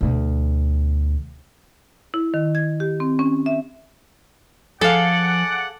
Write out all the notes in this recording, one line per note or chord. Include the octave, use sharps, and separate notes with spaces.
D2 B2
E4
D#3
G#6
G4
C4
C#4
E5
F3 G#4 A4 D5 F5 F#5